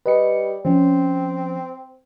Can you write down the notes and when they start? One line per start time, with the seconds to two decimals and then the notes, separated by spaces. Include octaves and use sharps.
0.06 G3 B4 D#5 C#7
0.65 F3 C4 C#4